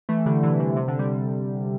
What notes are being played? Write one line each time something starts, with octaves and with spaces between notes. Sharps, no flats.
E3 A3
D3 G3
C3 E3
D3
C3
D3
D3 G3